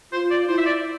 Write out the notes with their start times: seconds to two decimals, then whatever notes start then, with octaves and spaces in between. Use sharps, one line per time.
0.12 F4 C5
0.31 D5
0.48 E4 C5
0.58 E5
0.66 D5